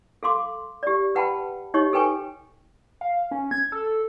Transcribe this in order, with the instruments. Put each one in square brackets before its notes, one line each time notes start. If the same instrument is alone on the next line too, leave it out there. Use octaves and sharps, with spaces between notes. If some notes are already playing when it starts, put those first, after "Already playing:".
[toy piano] A4 F5 C6 D6
G4 D5
B4 F#5 G5 A5 B5
D#4 G4 C#5 D#5 C#6
A4 B4 G5 G#5 C#6
[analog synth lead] F5
C#4
G#6
A4